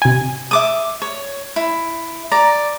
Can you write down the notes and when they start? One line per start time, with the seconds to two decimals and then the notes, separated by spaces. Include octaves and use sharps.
0.02 C3 G#5
0.51 E5 D6 D#6
1.02 C#5
1.56 E4
2.32 D5 A#5